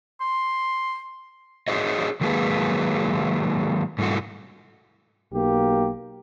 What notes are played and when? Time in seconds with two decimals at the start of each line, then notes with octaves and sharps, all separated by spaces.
0.20 C6
1.68 F#4 G#4 C5 C#5 D#5
2.21 D#3 F#3 G#3 A#3 G#4 B4
3.98 G#2 G3 A3 E4 F#4
5.33 B1 A#3 G4